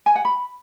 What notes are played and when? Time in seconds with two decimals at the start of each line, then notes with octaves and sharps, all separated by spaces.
0.06 G#5
0.15 F#5
0.25 B5